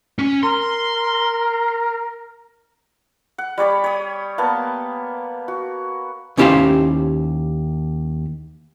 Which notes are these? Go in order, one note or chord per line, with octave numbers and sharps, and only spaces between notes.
C#4
A#4 C6
F#5
G3 C#5 D5 B5
C#5 D#6
A#3 B3 A5
F#4
D#2 C#4 E4 G4 C5 F5